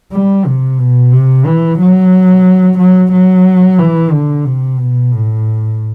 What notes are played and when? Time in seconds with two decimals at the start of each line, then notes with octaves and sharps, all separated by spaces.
0.12 G3
0.47 C3
0.79 B2
1.12 C3
1.46 E3
1.79 F#3
2.78 F#3
3.12 F#3
3.79 E3
4.12 D3
4.45 C3
4.79 B2
5.12 A2